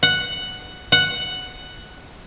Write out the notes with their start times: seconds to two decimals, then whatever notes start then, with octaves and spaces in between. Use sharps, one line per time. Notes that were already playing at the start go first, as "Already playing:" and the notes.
0.03 F#5
0.92 F#5